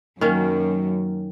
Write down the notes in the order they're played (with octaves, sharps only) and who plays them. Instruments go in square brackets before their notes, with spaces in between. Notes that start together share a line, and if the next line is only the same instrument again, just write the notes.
[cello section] F#2 [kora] D#3 A#3 C#4